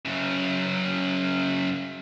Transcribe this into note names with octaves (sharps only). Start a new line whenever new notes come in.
F#2 C#3